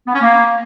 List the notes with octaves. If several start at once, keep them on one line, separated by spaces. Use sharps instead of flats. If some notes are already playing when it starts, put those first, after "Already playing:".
B3
C#4
A#3